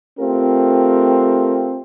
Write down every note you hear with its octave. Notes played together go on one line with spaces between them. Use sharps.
A3 C4 F4 G4 A#4